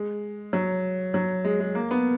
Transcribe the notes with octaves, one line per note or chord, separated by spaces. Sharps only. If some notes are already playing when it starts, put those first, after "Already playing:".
Already playing: G#3
F#3
F#3
G#3
G#3
A#3
B3